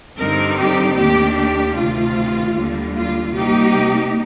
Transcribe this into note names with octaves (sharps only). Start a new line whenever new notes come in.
G2 D3 G3 C4 D#4 A#4
G4
D#2 D#3 A3 D4 G4
G4
D2 C3 D#3 F4
D#2 D3 G3
F4
C3 G3 A#3 D#4 G4